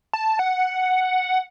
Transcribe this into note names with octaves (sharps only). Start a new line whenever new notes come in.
A5
F#5